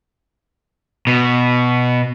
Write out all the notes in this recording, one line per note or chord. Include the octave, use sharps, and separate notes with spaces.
B2